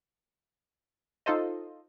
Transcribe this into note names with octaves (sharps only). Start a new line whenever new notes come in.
D#4 F4 A4 C5 D#5